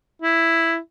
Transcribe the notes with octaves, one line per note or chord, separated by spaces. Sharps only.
E4